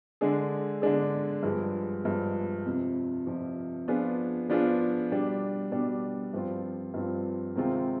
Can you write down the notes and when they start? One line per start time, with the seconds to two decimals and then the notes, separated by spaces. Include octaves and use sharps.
0.21 D3 G#3 D4 G#4
0.82 D3 G#3 D4 G#4
1.43 G2 F3 G#3
2.04 G2 F3 G#3
2.65 F2 C3 F3
3.27 F2 C3 F3
3.88 F3 B3 D4 F4 G#4
4.49 F3 B3 D4 F4 G#4
5.10 B2 G3 D4
5.72 B2 G3 D4
6.33 G2 F3 C4 F4
6.94 G2 F3 C4 F4
7.55 C3 D#3 G#3 C4 F4